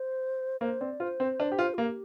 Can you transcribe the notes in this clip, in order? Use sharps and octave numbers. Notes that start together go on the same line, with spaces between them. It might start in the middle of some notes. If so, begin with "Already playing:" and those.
Already playing: C5
A#3 C5
C4 D5
F4 C5
C4
D4
G4
F4
F4
A#3 G4